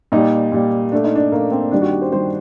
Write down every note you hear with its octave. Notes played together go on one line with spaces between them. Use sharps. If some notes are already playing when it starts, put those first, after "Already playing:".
A#2 G3 D#4
A#2 G3
A#2 A3 D4
D#4
D4
A#2 A3 A#3
C4
G2 D#3 G3 D4
F#4
G4
C5
G2 D#3 G3 C5